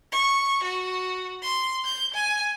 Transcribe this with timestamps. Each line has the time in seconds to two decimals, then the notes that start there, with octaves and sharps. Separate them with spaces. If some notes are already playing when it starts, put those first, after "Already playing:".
0.12 C#6
0.63 F#4
1.43 C6
1.85 G6
2.14 G#5